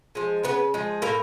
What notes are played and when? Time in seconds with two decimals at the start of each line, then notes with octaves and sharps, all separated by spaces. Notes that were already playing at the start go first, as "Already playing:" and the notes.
0.15 F3 G#3
0.43 C#3 B3 B4
0.74 F3 G#3
1.02 A2 A#3 A#4